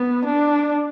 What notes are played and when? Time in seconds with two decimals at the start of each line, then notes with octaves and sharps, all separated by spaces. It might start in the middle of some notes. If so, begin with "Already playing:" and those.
Already playing: B3
0.25 D4